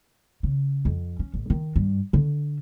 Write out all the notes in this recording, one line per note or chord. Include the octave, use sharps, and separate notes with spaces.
C#3
F2
C#4
A1
D#3
G2
D3